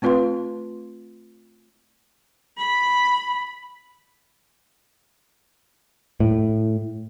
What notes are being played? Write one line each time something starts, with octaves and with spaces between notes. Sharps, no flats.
A3 C4 F4 B4 F5 C6
B5
A2